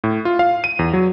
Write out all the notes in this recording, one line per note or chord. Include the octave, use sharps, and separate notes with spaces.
A2
F4
F5
D#7
E2
F#3